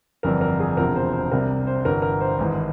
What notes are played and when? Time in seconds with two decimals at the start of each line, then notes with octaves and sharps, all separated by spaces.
0.23 G1 F2 E3 G3 A#4
0.41 A#4
0.60 G#4
0.77 E1 E2 C3 F3 A#4
0.96 C5
1.12 C5
1.31 C2 C3 G3 A#4
1.67 C5
1.85 G1 G2 E3 A#4
2.02 A#4
2.21 C5
2.38 G#1 G#2 E3